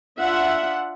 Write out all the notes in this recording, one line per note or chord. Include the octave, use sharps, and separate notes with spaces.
D4 F4 E5 F#5